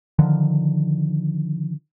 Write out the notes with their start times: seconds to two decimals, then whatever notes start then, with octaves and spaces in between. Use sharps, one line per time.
0.19 D3 D#3 F3